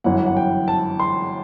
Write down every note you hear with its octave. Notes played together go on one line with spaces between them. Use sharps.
G1 F#2 E3 F#5
F#5
G5
A5
C6